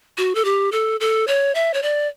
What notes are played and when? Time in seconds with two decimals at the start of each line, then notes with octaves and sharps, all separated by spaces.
0.18 F#4
0.35 A4
0.45 G4
0.72 A4
1.00 A4
1.28 C#5
1.55 E5
1.74 C#5
1.83 D5